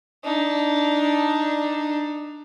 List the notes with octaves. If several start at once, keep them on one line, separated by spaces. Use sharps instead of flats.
D4 D#4